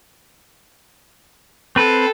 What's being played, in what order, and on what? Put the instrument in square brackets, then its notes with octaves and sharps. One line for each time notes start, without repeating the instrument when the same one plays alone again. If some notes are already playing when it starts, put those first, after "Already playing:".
[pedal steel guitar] C4 B4 [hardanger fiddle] A4